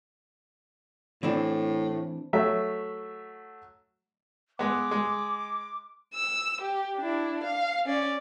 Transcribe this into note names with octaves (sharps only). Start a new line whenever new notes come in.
A2 E3 C4 D4
F#3 A3 E5
G#3 B3 D6
G#3
E6
G4
D4 E4
F5
C#4 D5